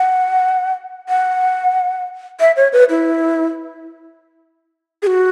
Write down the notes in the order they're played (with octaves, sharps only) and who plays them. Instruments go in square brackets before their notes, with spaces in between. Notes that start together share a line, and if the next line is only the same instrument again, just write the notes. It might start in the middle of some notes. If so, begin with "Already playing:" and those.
Already playing: [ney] F#5
F#5
E5
C#5
B4
E4
G#4
F#4